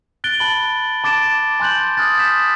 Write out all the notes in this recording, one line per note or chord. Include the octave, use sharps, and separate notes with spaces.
F#6 A6 D7 G7
A5 B5 F#7
A5 D6 A6 D7 E7
G#5 C6 F#6 G6 F#7
D#6 F6 F#6 A6
G6 B6 E7